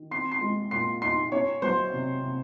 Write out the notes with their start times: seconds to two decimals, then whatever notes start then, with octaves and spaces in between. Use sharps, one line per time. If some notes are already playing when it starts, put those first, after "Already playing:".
Already playing: D#3
0.11 C4 C6 C7
0.32 C6 C7
0.41 G#3
0.71 A#2 C6 C7
1.02 D#4 C6 C7
1.32 C#4 C#5 C#6
1.62 F#3 C5 C6
1.92 C3
2.22 C3